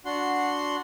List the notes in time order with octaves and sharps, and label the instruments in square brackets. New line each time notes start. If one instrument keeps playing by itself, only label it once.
[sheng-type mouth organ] D4 F#4 F#5 C6